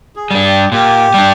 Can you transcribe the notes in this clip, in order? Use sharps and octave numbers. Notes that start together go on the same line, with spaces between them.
G#4
G3 D4
G4
A#2 G4
G3 D4